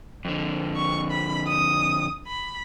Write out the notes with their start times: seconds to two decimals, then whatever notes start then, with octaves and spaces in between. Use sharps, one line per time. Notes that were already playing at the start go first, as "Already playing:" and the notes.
0.25 F2 D3
0.76 C#6
1.11 B5
1.48 D#6
2.27 B5